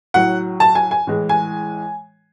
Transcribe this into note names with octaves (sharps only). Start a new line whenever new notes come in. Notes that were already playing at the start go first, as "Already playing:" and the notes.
A2 F#3 F#5
A5
G#5
G#5
A2 E3 G#3
G#5